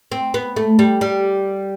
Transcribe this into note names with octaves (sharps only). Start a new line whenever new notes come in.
C4
B3
A3
G3
G3